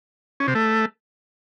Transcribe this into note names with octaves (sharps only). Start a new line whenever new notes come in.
C#4
C3
A3